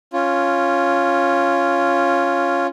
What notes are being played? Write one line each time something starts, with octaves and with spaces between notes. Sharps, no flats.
C#4 F4